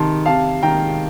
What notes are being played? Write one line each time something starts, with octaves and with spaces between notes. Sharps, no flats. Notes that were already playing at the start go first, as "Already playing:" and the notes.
Already playing: C3 D#3 A5 C6
C3 F5 A5
D#3 G5 A#5